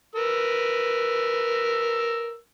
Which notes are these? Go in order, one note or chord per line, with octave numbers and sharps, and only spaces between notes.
A#4 B4 E6